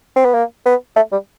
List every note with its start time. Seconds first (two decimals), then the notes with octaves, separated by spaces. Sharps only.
0.16 C4
0.25 B3
0.34 A#3
0.66 B3
0.96 A3
1.12 G3